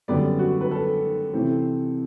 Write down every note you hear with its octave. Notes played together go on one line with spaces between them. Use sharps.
F#2 D3 G3 B3 D5
F#4
B4
A4
C3 E3 A3 C4